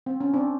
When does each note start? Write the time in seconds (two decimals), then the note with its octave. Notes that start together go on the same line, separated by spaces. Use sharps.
0.06 C4
0.21 C#4
0.34 C4 D4